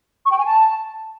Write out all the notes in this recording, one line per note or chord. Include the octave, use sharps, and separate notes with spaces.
C#6
G5
G#5
A5